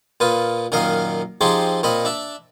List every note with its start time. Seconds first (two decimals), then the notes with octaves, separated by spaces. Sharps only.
0.20 A#2 F4 B4 D#6
0.72 F#2 A#2 D#3 A#4 D#5 F5
1.41 F3 C4 D#4 G4 G#4 C5
1.83 A#2 C4 D#5 B5
2.05 D4 E5